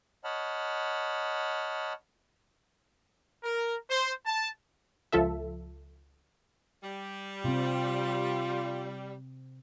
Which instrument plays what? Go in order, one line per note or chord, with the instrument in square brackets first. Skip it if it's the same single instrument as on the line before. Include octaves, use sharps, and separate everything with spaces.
[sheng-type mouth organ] C#5 D#5 F#5 A5 B5 F6
[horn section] A#4
C5
A5
[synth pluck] C#2 F3 F4 A4 E5
[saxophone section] G3
[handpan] C3 C4 [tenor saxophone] F4